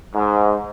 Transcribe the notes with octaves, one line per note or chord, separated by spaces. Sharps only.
G#2